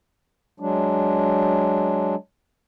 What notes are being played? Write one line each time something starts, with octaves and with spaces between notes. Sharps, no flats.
F#3 G#3 D4